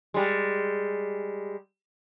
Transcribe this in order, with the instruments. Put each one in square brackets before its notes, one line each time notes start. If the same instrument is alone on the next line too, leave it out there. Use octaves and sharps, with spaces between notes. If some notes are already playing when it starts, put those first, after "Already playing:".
[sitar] G3 G#3